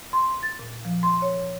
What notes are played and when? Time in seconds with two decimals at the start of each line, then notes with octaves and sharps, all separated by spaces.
0.13 C6
0.43 A6
0.59 A#2
0.85 F3
1.03 C6
1.22 C#5